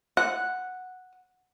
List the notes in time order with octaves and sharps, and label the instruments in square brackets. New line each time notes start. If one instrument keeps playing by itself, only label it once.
[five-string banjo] F#5